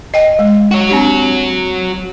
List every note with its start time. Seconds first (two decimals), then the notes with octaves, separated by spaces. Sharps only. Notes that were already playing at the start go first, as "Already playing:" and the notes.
0.14 D#5 G5
0.39 G#3
0.71 F#4 C#5
0.89 C4 D4 G4